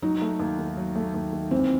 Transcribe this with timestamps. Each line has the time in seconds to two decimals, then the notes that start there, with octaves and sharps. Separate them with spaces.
0.02 F#3 D#4
0.22 A3
0.40 D#2
0.59 D#3
0.77 F#3
0.96 A3
1.14 D#2
1.33 D#3
1.51 E3 C4